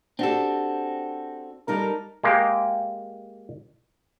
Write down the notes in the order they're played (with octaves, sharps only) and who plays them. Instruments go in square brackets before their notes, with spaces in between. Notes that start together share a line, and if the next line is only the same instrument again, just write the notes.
[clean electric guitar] C4 F#4 A4 [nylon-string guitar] D4 G4
[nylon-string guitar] G3 D#4 A4 [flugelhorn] A#4
[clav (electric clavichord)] G#3 A#3 G4